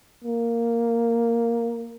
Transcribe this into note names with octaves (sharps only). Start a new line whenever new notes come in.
A#3